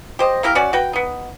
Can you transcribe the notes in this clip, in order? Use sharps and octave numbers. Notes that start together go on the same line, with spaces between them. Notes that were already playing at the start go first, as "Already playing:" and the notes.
G4 C5 D#5
A#3 E4 G4 A#4
C#4 F#4 D5
F#4 B4 G5
B3 D#4